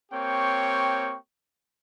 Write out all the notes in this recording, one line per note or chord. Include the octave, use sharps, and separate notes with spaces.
A#3 C4 G4 C#5 G5 C#6